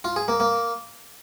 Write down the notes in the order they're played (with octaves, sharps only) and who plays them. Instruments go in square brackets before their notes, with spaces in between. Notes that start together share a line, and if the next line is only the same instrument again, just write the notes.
[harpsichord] F4
G#4
A#3
A#3